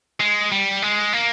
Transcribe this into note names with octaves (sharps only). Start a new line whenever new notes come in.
G#3
G3
G#3
A#3